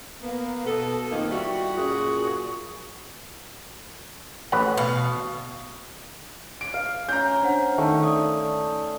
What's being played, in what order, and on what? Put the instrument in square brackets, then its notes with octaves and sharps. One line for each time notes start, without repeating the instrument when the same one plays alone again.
[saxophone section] A#3 B3
B2 A4
F2 D#3 F3 A#3
G3 E4 F#4
F#2 A#2 F#4 G#4
[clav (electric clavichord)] A1 B4 F#5
[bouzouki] B2 F5
[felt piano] D7
[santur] F5
[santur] C#4 [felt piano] A#5 G6
[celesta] D4 C5 F#5
[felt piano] D#3 [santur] A3
[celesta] D5 D#6